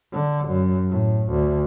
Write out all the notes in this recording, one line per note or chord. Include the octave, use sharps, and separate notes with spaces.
D3
F#2
A2
D2